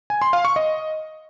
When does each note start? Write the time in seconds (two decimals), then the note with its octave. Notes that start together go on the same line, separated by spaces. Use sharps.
0.10 G#5
0.22 C6
0.33 F5
0.45 C#6
0.56 D#5